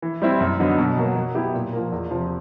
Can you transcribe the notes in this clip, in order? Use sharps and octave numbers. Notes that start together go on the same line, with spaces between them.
E3
G3 C4 E4
F#2
D3 F#3 B3 D#4
B2
F#3 A#3
F#3
B3 E4 G4
A#2
F3 A#3
E2
C3 F3